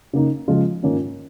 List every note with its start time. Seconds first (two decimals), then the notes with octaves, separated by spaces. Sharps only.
0.13 C#3 A#3 D#4
0.48 C#3 F3 G#3 F4
0.83 G#2 D#3 A#3 C#4 F4